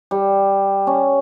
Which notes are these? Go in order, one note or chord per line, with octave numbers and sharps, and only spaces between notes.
G3
C#4